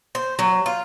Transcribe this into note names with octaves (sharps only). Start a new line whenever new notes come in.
C5
F#3
F4